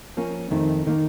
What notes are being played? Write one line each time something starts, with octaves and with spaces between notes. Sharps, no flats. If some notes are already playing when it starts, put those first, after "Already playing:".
F3 A#3 C#4
F2 D#3 A3 C4
D#3 A#3